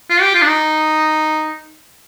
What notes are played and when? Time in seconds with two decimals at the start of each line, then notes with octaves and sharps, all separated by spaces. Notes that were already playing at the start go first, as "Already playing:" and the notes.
0.10 F4
0.22 G4
0.35 F4
0.42 D4
0.47 D#4